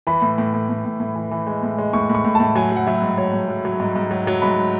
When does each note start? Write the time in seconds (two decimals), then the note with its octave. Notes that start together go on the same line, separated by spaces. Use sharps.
0.07 E3 B5
0.22 A2
0.38 A2
0.54 A2
0.69 A2
0.85 A2
1.00 A2
1.15 E3
1.31 E3
1.47 G#3
1.63 A2
1.78 G#3
1.93 A2 C#6
2.10 A2
2.15 C#6
2.25 A2
2.35 A2 A5
2.55 F#3 G#5
2.72 F#3 F#5
2.87 F#3 E5
3.02 G#2
3.18 F#3 C#5
3.33 G#2
3.49 F#3
3.65 F#3
3.80 G#2
3.96 G#2
4.11 F#3
4.27 F#3
4.42 G#2 B5